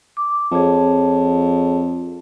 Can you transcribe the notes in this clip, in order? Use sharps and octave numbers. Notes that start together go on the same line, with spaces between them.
D6
F2 G#4 C#5 A5